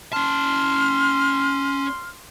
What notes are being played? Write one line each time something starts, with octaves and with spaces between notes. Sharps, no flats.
C#4 A5 C6 F6